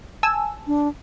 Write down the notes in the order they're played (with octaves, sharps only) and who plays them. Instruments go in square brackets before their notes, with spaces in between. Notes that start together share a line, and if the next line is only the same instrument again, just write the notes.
[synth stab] G#5 A5 E6
[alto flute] D4